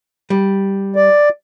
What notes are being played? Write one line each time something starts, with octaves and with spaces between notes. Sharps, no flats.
G3
D5